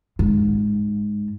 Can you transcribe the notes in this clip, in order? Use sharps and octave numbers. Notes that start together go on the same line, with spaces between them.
G#2